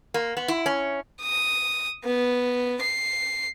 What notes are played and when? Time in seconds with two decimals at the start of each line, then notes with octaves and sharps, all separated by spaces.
0.14 A#3
0.37 B3
0.48 E4
0.66 C#4
1.22 D#6
2.04 B3
2.82 C7